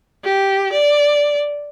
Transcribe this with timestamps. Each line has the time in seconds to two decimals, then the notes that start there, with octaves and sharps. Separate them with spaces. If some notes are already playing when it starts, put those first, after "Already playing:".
0.24 G4
0.73 D5